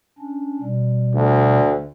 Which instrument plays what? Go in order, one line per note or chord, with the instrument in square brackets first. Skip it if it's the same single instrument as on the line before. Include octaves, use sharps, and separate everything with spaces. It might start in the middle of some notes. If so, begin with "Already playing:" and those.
[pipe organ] C#4 D4
B2 G3
[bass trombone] D2